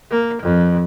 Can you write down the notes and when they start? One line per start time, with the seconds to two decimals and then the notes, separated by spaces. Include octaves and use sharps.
0.11 A#3
0.42 F2